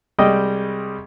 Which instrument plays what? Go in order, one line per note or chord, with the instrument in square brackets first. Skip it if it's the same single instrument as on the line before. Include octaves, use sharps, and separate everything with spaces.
[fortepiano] C2 G3 G#3 D#5 G5